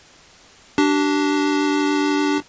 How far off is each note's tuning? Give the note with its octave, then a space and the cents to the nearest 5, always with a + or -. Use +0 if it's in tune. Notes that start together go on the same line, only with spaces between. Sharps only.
D4 +0 G4 -35